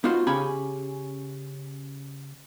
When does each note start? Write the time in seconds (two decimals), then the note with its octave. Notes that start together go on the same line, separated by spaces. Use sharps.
0.04 B3 D#4 F4 F#4 C5
0.27 C#3 C#4 G4 G#5 B5